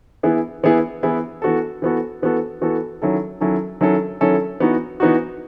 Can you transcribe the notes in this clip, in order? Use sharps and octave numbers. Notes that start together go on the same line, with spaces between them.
E3 B3 E4 G#4
E3 B3 E4 G#4
E3 B3 E4 G#4
E3 B3 F#4 A4
E3 B3 F#4 A4
E3 B3 F#4 A4
E3 B3 F#4 A4
D#3 F#3 C#4 E4 A4
D#3 F#3 C#4 E4 A4
D#3 F#3 C#4 E4 A4
D#3 F#3 C#4 E4 A4
E3 B3 D#4 F#4
E3 B3 D#4 F#4